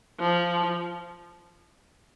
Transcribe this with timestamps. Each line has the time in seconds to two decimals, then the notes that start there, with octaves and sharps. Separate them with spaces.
0.19 F3